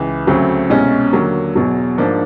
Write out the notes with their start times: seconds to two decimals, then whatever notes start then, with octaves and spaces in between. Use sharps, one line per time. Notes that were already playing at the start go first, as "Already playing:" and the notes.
Already playing: C#2 E3
0.27 D2 C#3 F#3 A3 C4
0.70 C2 B2 G#3 C#4
1.13 D#2 D3 F#3 A#3
1.56 E2 B2 F#3
1.98 G#2 F3 A#3 D4